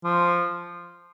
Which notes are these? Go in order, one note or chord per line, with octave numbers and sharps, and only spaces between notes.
F3